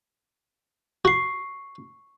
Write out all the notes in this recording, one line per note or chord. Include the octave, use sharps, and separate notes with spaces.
F#4 C#6 C7